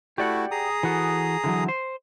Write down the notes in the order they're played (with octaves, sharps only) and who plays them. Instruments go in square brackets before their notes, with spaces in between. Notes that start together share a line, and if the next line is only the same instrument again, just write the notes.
[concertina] A3 E4 F#4 [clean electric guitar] G4 D5 F#5
[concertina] G#4 A#5 D#6
[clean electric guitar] E3 F#4 A4
D3 E3 F#3
C5